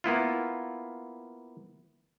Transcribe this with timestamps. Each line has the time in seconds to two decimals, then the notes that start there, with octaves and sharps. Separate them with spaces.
0.04 A#3 B3 E4 F4